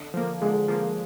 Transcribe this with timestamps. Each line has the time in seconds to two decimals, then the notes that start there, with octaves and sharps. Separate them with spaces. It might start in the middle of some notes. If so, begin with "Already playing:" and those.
Already playing: D3
0.14 F3 A#3
0.42 D3 G#3
0.68 F3 A#3